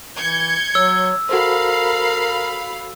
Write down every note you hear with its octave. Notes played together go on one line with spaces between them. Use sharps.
E3 G6 G#6 C#7
F#3 C#5 E6
F#4 A4 A#4 C5 F5 B5 C7